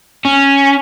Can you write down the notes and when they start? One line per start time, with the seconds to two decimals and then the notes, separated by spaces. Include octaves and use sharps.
0.25 C#4